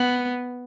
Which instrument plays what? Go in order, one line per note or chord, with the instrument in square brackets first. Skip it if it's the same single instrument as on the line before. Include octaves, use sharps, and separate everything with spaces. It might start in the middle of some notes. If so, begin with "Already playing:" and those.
Already playing: [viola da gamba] B3